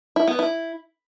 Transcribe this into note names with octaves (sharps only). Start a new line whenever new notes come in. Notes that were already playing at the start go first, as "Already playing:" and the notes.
E4
B3
E4